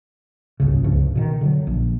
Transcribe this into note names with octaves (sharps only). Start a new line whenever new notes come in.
D#1 G#1 C#2 C#3
C#2 G2 C#3 F3
B2 D3 D#3
D3 D#3 F#3
A#1